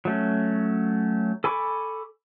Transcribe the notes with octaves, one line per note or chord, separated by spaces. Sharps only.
F#3 A3 C#4
A4 G#5 B5 C#6 D6